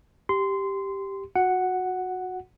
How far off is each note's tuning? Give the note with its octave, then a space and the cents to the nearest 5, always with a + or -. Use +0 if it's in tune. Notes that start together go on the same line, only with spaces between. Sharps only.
G4 +0 C6 -15
F#4 -20 F#5 +0